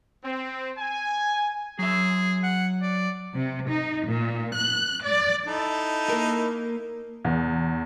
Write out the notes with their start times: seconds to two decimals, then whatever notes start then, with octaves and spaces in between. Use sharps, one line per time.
0.24 C4
0.78 G#5
1.79 F#3 G#4 E5
2.43 F#5
2.82 D5
3.33 C3
3.69 D#4
4.07 A#2
4.54 F#6
5.03 D5
5.46 D#4 E4 A4
6.09 A#3 A#4
7.25 E2